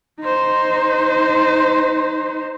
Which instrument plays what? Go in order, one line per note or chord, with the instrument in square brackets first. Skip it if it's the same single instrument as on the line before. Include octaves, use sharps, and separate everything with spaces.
[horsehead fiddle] D#4 C5